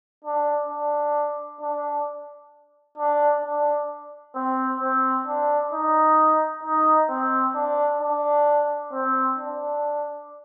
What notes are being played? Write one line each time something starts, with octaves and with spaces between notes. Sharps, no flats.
D4
D4
D4
D4
D4
C4
C4
D4
D#4
D#4
C4
D4
D4
C4
D4